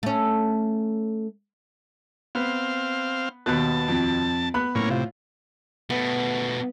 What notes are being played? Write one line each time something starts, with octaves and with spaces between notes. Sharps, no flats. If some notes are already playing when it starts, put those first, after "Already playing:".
A3 C#4
B3 C4 F5
D#2 B2 B3 A5 F#6
F2
B3 B5 F#6
A2 A#3 C#4
C3 F4
B2 A3 B3